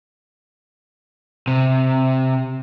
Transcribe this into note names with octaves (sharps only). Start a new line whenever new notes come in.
C3